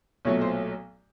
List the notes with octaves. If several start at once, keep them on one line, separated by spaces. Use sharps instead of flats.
B1 A#2 F#3 A3 C#5
C5